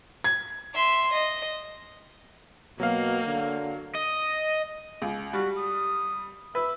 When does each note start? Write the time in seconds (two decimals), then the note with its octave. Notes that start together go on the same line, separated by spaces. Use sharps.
0.24 G#6
0.74 E5 C6
1.13 D#5
2.80 B2 F#3 A#3 F5
3.25 D3
3.95 D#5
5.02 C#2
5.33 G3 F#4
5.57 D#6
6.55 B4 E5